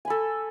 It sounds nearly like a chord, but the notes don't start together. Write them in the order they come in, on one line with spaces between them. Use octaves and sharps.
G#5 B5 A4